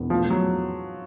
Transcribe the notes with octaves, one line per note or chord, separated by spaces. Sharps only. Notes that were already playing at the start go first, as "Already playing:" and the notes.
Already playing: E1 E2
F3 A3
F#3